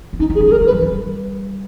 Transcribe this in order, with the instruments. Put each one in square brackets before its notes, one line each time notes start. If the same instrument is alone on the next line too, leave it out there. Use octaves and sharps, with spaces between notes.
[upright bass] B3
[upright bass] C#4 [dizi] D#4
[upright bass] B3
[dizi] G#4
[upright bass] C#4
[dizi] G#4
[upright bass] G#3 [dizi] A#4
[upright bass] G3
[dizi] B4
[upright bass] E3
G3